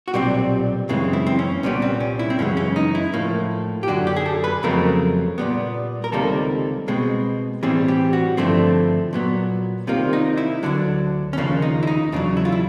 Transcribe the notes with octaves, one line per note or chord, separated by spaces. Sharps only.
F#4
B1 A#2 G3 C4 G4
F#2 C#3 E3 G#3 C4
E4
C4
C#4
C2 A#2 G3 B3 C#4
C4
C#4
E4
C4
F#2 C#3 E3 G#3 C#4
C#4
D#4
E4
A2 F3 A#3
G4
F#2 D3 F#3 F#4
G4
G#4
A4
B4
F2 C#3 F#3 A3 C4 A#4
A#2 G3 B3
A#4
C#2 C3 D#3 G3 A#3 A4
B2 G#3 C4
A2 E3 G3 C4 G#4
G4
F#4
G2 D3 F3 A3 C4 E4
A#2 F#3 B3
C2 C3 D#3 G3 A#3 F4
D#4
E4
D2 D3 F#3 D4
C#4
D#2 C#3 F3 A#3 D4
D#4
E4
D#4
E2 C#3 F#3 D4
E4
F4
E4